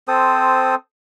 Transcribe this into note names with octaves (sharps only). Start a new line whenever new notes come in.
C4 A4 C5 D#6